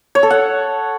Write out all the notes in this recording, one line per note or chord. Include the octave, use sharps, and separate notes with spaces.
C#5
A4
F#5